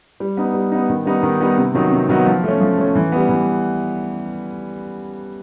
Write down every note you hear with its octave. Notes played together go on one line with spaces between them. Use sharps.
G3
B3 D#4
G3
B3 D#4
D#3
G3 B3 D#4
D#3
G3 B3 D#4
C3
D#3 F#3 B3 D#4
C3
D#3 F#3 B3 D#4
F3
A3 C#4
F3
A3 C#4
E3
G3 B3
E3